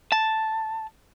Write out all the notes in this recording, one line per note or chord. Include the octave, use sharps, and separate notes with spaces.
A5